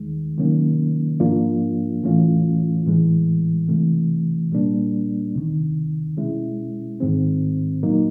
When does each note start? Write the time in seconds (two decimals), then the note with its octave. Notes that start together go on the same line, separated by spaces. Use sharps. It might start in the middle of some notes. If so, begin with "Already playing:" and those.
Already playing: D#2 D#3 G#3
0.37 C3 D#3 F#3 A#3 C#4
1.20 G#2 F3 A#3 D4 F4
2.02 A2 E3 A3 C#4 F4
2.86 A2 E3 G#3
3.68 C3 E3 A3
4.52 A#2 G3 A#3 D4
5.34 D2 C3 D#3
6.17 B2 G#3 C#4 E4
7.00 G#2 D#3 G#3 C4
7.83 A#2 F#3 A#3 D#4